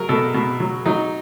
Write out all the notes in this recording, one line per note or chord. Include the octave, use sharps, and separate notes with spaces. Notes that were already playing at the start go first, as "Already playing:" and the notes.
Already playing: F#3 A#4
B2 A4
B2
F#3
F#3 D#4